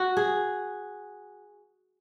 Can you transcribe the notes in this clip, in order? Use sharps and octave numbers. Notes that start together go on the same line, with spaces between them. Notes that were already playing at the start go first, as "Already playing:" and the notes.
Already playing: F#4
G#4